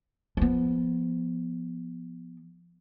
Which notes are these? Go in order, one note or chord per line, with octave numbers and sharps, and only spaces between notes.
F3 B3